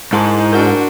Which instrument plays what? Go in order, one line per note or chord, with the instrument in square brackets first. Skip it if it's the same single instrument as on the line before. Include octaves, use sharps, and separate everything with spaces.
[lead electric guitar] G#2 [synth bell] E4 A5 C6
[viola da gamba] D4 F#4 [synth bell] A#4 A#5 F6